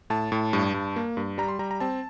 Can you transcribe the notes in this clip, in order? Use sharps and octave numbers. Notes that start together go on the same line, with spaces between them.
A2 A5
A2
G2
G2
A#3
G2
G3 A#5
C6
G3 A#5
A#5
C4 A5